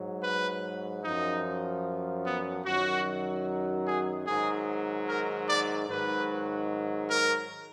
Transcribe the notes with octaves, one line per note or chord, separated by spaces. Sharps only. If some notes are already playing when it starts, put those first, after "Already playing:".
Already playing: G#2 F#3
B4
F#2 F3 D#4
B3
F#2 D#3 F#3 F#4
G#4
G#2 D#3 F#3 G#4
A#4
D5
G#2 D#3 F#3 B4
A#4